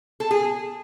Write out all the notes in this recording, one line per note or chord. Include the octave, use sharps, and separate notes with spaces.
A4
G#4